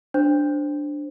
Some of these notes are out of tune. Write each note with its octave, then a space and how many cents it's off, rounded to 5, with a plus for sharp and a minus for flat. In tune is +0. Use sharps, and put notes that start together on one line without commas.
D4 +0 C5 +0